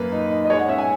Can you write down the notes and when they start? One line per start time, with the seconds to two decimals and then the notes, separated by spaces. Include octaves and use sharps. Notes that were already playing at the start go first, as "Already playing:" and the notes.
Already playing: F#2 A#3 B4
0.12 D#4
0.30 D#4
0.45 D#5
0.50 G#3 C#5
0.59 F#5
0.68 C#4 E5
0.78 G#5